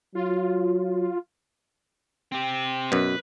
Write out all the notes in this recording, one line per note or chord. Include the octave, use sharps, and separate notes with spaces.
F#3 F4
C4 G4
F#2 B2 B4